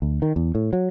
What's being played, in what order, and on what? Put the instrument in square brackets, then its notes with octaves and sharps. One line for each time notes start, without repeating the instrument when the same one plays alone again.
[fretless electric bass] D2
D#3
E2
A2
F#3